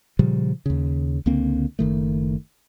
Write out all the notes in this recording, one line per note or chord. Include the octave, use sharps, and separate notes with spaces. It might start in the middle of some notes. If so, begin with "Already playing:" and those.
A#2 C#3 F3 G3
D#2 C#3
C#2 D3 A#3 C4
F#1 D#3 A3